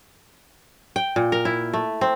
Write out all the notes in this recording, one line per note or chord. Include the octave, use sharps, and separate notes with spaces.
G5
A#2
A#4
E4
A3
C4